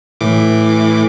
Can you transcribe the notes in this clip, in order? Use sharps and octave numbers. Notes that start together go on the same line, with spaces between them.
A2 E3 D6